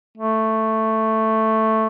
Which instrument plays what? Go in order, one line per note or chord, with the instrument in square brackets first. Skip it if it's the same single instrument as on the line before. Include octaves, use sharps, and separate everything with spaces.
[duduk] A3